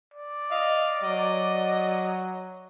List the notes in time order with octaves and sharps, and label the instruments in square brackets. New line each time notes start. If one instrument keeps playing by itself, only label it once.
[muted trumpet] D5
[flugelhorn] D#5 [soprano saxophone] F5
[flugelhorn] F#3 [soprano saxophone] D#5